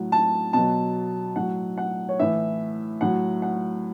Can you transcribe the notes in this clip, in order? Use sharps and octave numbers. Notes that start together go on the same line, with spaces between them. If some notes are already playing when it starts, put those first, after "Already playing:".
Already playing: A2 F#3 F#5
A5
B2 F#3 A5
A2 F#3 F#5
F#5
C#5
A2 E3 E5
A2 F#3 F#5
F#5